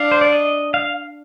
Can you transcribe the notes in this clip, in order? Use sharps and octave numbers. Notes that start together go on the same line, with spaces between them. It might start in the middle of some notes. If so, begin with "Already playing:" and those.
Already playing: D4 F5
C5
D5
D#5
F5